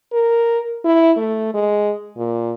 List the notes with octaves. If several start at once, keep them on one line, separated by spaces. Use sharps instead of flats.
A#4
E4
A3
G#3
A#2